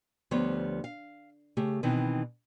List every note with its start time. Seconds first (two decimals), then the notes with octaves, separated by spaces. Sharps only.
0.31 D2 F3 G3 B3 C5 C#5
0.84 F5
1.57 C#3 A3 G4
1.83 B2 D#3 E3 C4 D#4